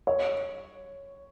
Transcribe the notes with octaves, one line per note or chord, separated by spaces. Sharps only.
C#5